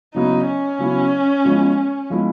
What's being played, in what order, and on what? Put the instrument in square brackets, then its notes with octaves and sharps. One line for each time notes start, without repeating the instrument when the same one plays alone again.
[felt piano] C#3 F#3 B3 E4 [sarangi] D#4
[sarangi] C#4
[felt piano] C#3 F#3 B3 E4
F3 G#3 B3 E4
F3 G#3 B3 E4